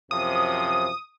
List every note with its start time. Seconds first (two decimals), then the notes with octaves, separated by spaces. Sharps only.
0.11 F#2 C3 F3 D#6